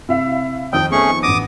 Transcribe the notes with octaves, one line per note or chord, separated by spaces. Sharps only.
C3 E4 E5 F5
F2 D#3 F3 G5 D#6
A3 B3 C#4 G#4 C#6
A1 B3 D4 D6 D#6 A#6